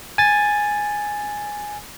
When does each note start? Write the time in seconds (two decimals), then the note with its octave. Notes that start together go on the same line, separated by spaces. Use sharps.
0.18 G#5 A6